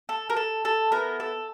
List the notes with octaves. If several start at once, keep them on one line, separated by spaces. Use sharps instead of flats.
A4
A#4
A4
A4
B3 E4 A4 A#4
A4